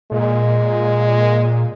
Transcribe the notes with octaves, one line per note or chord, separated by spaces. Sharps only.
A#2 G#3